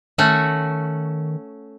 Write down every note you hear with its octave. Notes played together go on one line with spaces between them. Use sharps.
D#3 A3 C#4 F#4